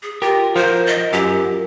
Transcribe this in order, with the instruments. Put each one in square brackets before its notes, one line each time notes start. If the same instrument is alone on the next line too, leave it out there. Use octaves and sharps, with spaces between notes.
[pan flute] G#4
[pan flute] F4 [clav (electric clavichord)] G4 [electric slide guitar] A#4
[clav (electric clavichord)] F3 [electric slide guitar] F4 F#4 A#4 [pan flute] C5
[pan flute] D#5
[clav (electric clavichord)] F#2 [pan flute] G4